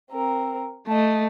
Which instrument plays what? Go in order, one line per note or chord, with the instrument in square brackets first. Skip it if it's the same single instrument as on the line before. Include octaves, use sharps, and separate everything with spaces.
[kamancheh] C4 A#4
[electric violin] A3 [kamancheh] D#5 A5